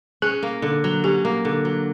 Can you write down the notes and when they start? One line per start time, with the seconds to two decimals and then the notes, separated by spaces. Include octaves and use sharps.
0.22 C#4 G#4
0.43 A#3
0.62 D3
0.84 F#3
1.04 C#4 G4
1.25 A#3
1.45 D3
1.65 F#3